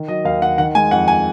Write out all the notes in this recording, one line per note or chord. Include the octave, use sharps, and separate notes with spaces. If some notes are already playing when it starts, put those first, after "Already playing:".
Already playing: D#3
F#3 D#5
D#2 F5
D#2 F#5
D#3 F#5
G#3 G#5
F2 F#5
G#5